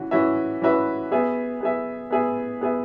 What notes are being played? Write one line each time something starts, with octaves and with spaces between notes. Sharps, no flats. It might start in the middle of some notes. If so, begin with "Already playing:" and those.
Already playing: E3 C#4 F#4
E3 C#4 F#4 B4 E5
E3 C#4 F#4 B4 E5
B3 G#4 E5
B3 G#4 E5
B3 G#4 E5
B3 G#4 E5